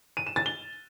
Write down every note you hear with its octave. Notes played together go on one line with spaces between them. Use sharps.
D#7
E7
A6
G7